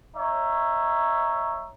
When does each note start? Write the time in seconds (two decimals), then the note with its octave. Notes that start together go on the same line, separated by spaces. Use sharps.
0.16 D#4 C#5 E5